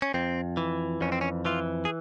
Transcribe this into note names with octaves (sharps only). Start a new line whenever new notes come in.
C#4
F2 C4
E3
F2 C#4
C4
C#4
E3 F4
G#4